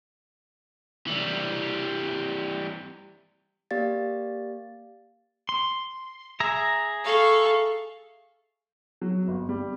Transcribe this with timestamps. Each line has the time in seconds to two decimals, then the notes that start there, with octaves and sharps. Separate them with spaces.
1.07 E3 G3
3.71 A#3 G4 D5 F5 A6
5.49 C6
6.40 G#4 E5 A#5
7.04 A4 F5 C#6
9.02 F#3
9.28 G1
9.49 G3